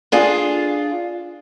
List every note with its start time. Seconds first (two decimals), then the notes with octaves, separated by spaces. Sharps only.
0.12 D4 F4 G#4